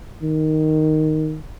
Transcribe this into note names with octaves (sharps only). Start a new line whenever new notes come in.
D#3